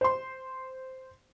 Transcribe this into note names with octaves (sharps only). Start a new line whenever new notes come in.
C5 C6